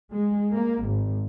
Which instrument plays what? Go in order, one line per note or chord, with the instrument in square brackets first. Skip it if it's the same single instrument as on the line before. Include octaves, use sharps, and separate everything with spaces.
[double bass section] G#3
A#3
G#1